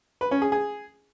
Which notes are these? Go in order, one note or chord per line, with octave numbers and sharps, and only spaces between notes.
B4
C#4
G#4
G#4